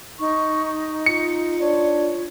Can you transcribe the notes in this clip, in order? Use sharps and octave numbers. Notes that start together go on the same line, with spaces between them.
D#4 C#6
F4 C#7
D4 C#5